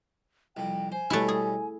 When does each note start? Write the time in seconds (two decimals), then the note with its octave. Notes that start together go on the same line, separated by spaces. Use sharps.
0.57 C2 F2 G5
0.92 C5 G#5
1.10 B2 G3 A3 C#4 E4
1.28 G#4